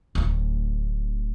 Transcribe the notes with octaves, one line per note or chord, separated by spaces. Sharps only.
D1 D2